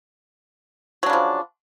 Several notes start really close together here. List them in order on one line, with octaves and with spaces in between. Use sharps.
F#3 D4 C#3 F3